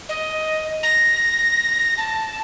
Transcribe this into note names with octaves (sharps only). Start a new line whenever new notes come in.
D#5
A#6
A5